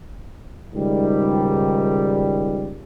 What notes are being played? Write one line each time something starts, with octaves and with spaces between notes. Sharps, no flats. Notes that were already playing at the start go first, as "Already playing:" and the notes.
C#2 G#2 D#3 G3